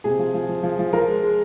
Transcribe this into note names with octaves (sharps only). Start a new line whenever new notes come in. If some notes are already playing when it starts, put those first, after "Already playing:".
C3 G#4
F3
F3
F3
F3
F3
F3 A#4
G#3
G#3